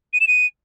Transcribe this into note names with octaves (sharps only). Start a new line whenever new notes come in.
D#7
E7
D#7